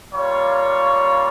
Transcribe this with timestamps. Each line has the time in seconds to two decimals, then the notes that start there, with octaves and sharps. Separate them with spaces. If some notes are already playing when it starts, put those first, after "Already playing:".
0.13 G3 A#3 F4 C#5